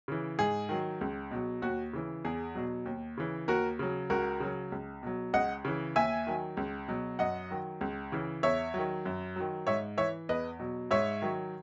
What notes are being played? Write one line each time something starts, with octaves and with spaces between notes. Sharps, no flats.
C#3 E3
G#2 G#4
D#3 F#3
C#2
B2 F#3
D#2 F#4
C#3 E3
E2 G#4
B2 F#3
D#2
C#3 E3
D#2 F#4 A#4
C#3 F#3
C#2 F#4 A#4
C#3 F#3
C#2
B2 F#3
C#2 D#5 F#5
C#3 E3
D#2 E5 G#5
D#3 F#3
C#2
B2 F#3
F#2 D#5 F#5
D#3 F#3
C#2
C#3 E3
E2 C#5 E5
D#3 F#3
F#2
D#3 F#3
G#2 C#5 E5
E3 C#5 E5
E2 B4 D#5
B2 F#3
G#2 C#5 E5
D#3 F#3